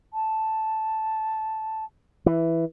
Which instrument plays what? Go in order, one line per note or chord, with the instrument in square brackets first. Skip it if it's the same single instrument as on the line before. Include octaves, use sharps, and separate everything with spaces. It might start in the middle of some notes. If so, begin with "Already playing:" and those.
[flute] A5
[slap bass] E3